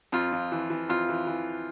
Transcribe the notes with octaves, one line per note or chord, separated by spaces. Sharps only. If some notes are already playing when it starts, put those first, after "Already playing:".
F2 F4
F2
E3
E3
F2 F4
E3
E3